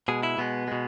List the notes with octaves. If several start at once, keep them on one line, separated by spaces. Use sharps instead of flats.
B2 G#3 G#4
E4
B2 G#3 B3
B2 G#3